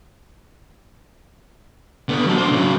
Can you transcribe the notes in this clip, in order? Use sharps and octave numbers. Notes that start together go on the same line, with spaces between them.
D3 B3
F#3 A5
D4 C5
C#3 F#3